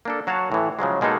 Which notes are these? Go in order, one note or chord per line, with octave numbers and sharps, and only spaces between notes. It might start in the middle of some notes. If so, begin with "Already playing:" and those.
A#3 D4 A4
F#3 F#4 C#5 F5 A5
A2 E3
C#3 F3 F#3 G#3
B2 G#3 A#3 D#4 A4